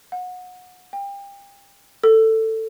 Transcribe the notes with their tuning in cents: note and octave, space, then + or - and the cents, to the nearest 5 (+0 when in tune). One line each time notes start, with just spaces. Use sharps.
F#5 -25
G5 +30
A4 +15